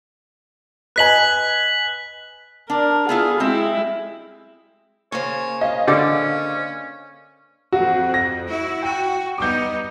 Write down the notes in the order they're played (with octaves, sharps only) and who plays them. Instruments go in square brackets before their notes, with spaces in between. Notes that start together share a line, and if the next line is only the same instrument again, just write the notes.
[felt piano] B4 D#5 G#5 [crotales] F#6 B6 F#7
[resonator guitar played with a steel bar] D4 [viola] A#4
[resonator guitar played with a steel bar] B3 E4 F4 [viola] G#4
[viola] G#3 E4 [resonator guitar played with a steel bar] C4
[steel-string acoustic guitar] C#3 A#3 C5 [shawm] C#5
[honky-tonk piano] D#5 F5
[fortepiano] D3 D5 [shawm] C#4
[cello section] F2 [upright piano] F#4
[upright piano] A#6
[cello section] E4 F#4
[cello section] F#4 [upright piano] G5
[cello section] G3 B3 D#4 [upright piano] D6 G6